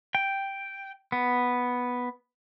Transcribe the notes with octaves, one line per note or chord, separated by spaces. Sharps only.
G5
B3